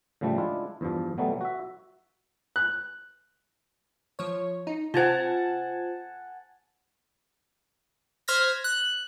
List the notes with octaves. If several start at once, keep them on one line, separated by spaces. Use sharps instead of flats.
A2 C#3 F3 G3 A3
G#3 D4 E4 F4
E2 G2 F3
B2 F#3 G3 A3 B3
F#4 E5
F#6
F3 C#5
D#4
C3 F4 C5 F#5 G#5 A5
C5 F6 G#6 A#6 B6
F#6